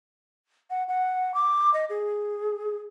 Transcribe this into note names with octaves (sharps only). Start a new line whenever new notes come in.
F#5
F#5
D6
D#5
G#4